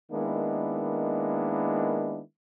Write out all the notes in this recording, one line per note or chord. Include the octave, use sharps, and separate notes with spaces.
D#3 G#3 A#3 B3 D4 E4